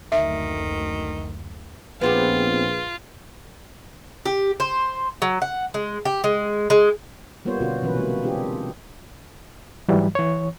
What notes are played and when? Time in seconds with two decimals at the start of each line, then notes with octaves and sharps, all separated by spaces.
0.12 F#1 D2 D#3 E5
2.01 A#1 B3 C4 F4 G4 G#4 B4
4.26 G4
4.60 C5
5.22 F#3
5.42 F#5
5.74 G#3
6.05 G4
6.24 G#3
6.70 G#3
7.45 G3 A#3 B3 F4 C5 C#5
7.61 B2 D3 B3 C#4 F4 F#4
7.82 B2 E3 F#3 C#4 B4
7.95 C3 G#3 A#3
8.22 C4 D4 F4 G4 G#4
9.88 G#2 E3 F#3 G3
10.15 E3 C#5